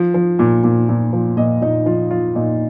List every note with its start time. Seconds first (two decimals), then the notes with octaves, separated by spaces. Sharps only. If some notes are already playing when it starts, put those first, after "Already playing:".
Already playing: F3
0.14 F3
0.39 A#2
0.64 A#2
0.89 A#2
1.13 F3
1.37 A#2 D#5
1.62 A#2 D#4
1.86 F3 F4
2.11 F3 F4
2.35 A#2 D#4